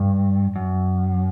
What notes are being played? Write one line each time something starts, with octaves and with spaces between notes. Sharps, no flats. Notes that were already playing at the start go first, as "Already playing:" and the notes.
Already playing: G2
F#2